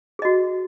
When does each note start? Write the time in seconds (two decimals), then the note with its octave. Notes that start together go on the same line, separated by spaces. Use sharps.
0.19 G#4
0.22 D#5
0.25 F#4